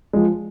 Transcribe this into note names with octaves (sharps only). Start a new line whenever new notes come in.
F3 G#3